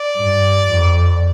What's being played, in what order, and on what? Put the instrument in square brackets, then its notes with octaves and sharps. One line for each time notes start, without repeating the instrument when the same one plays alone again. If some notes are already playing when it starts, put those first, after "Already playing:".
Already playing: [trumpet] D5
[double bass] G2
F2